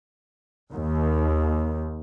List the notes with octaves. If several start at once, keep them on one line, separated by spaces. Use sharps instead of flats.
D#2